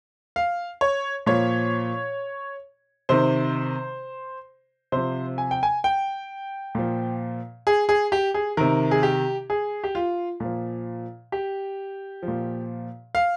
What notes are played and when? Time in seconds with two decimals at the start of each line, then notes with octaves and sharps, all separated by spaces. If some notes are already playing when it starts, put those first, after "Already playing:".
0.36 F5
0.81 C#5
1.26 A#2 F3 C#5
3.09 C3 D#3 C5
4.92 C3 F3 C5
5.38 G#5
5.51 G5
5.63 G#5
5.84 G5
6.75 A#2 F3
7.67 G#4
7.89 G#4
8.12 G4
8.34 G#4
8.57 C3 D#3 A#4
8.91 G#4
9.03 G4
9.50 G#4
9.84 G4
9.95 F4
10.40 A#2 F3
11.32 G4
12.23 F3
12.28 A#2
13.15 F5